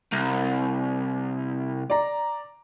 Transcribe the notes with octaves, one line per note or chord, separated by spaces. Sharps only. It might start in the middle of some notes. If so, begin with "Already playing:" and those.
C2
D5 A#5